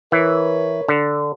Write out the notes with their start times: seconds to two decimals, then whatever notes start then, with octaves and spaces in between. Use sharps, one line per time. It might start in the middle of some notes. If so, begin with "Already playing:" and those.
0.12 E3 A#4 B4 C#5
0.88 D3